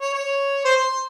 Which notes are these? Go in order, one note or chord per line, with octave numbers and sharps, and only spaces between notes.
C#5
C#5
C5
C6